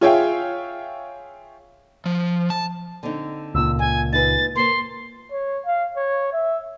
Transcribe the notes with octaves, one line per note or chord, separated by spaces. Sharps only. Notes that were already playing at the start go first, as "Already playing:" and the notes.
F4 G#4 C#5 E5 F5 G5
F3
A5
D3 C4 D#4
C#2 A#2 E6
C#3 G#5
D#4 G#4 B4 A6
A#3 A#4 C5 C6
C#5
F5
C#5
E5